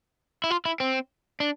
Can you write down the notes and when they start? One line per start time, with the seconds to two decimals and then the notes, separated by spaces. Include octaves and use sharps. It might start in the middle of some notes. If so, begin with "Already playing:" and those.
0.44 E4
0.50 F4
0.65 E4
0.80 C4
1.40 D4